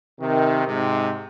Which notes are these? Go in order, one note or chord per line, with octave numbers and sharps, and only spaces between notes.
C3 D#3
G#2 C3